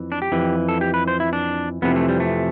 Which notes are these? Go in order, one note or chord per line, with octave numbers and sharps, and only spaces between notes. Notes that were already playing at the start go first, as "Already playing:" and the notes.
Already playing: F2 E3
D4
G4
F2 E3
A4
G4
B4
C5
E4
D4
F2 C3 E3 B3
A3
G3
A3